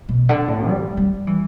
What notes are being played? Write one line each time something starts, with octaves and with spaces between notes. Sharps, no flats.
B2
D3
A2
G3
G3
E3